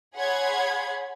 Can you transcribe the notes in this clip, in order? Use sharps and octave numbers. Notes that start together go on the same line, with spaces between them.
G#4 C#5 F#5 B5 C6 G#6